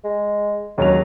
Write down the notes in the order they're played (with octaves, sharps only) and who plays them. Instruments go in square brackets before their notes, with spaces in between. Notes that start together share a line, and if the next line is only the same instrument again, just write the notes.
[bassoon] G#3
[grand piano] D#2 F#3 F7 [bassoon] C#3